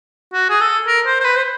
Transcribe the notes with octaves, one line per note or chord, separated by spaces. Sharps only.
F#4
G#4
A4
A#4
C5
C5
B4
C5